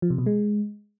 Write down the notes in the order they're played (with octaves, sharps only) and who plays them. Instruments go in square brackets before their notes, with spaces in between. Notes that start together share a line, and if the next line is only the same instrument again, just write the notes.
[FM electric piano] F3
C3
B2
G#3